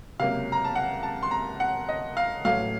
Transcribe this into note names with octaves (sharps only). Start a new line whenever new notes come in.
C#2 C3 F#3 A#3 F5
A#5
A5
F#5
A5
C6
A#5
F#5
D#5
F5
A1 A2 F#3 A3 F5